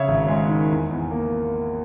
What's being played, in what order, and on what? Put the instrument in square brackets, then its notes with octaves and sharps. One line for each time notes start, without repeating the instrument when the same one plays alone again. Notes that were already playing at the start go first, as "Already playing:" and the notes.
Already playing: [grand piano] C#3 C#5 E5
G#1
G#3
D#3
E2
E2
A#3